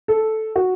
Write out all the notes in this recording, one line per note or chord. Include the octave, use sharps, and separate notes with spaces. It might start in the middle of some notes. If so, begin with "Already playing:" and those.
A4
F#4